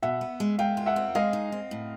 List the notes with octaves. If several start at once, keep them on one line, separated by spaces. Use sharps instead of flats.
B2 E5 F#5
B3
G#3
G#3 F5 G5
F4
E5 F#5
C4
G#3 D#5 F5
D#4
C4
A2